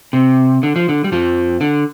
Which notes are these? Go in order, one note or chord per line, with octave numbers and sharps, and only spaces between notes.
C3
D3
F3
D3
G3
F2 F3
D3